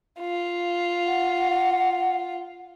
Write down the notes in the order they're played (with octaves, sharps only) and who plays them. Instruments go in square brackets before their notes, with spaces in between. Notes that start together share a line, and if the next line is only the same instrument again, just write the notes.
[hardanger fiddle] F4
[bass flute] F#5